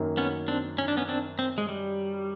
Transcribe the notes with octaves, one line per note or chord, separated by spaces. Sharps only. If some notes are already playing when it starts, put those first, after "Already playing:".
Already playing: F#2 D#3 F#3 A#3
B3 C#4
C4 D4
C#4
D4
B3 C#4
C4 D4
C4
G#3
G3